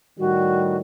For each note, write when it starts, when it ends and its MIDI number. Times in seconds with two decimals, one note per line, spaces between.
0.19 0.80 45
0.19 0.80 51
0.19 0.80 55
0.19 0.76 66